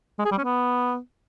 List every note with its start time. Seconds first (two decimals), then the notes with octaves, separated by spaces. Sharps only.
0.19 G#3
0.25 G#4
0.32 G3
0.38 C#4
0.44 B3